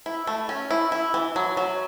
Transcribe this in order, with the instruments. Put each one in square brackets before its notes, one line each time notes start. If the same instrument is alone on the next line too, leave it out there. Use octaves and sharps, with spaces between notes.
[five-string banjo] E4
A3
C#4
E4
E4
E3
F#3
F#3